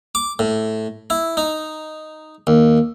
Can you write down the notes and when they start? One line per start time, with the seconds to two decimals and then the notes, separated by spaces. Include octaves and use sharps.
0.15 D6
0.39 A2
1.10 E4
1.37 D#4
2.47 D#2